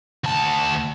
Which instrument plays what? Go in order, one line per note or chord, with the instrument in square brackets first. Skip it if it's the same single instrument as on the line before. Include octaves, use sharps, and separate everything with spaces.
[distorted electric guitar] D2 A5